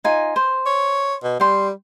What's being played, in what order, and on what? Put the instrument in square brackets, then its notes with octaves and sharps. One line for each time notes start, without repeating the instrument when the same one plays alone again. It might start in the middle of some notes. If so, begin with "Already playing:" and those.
[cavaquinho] D#4 F4 G#5
C5
[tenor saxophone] C#5
B2
[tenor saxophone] G3 [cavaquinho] G5 C6